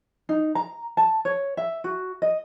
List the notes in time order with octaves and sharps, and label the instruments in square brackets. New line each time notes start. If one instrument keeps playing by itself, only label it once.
[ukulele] D#4
A#5
A5
C#5
E5
F#4
D#5